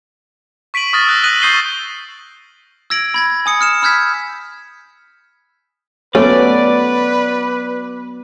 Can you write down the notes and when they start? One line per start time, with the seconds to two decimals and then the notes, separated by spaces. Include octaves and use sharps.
0.74 C#6 B6 D7 D#7 F#7
0.93 C#6 D#6 F6 A6 A#6
1.07 E6 F#6 A#6
1.23 D#6 F#6 A#6 D#7 F#7
1.42 C#6 D#6 G6 C7 D#7 G7
2.90 E6 G#6 A#6 D7 F#7
3.14 B5 G#6 A#6
3.46 G#5 D#6 C#7
3.61 F6 C#7 E7
3.82 B5 E6 F6 G6 G#6 B6
6.15 F#3 A3 B3 C#4 B4 D5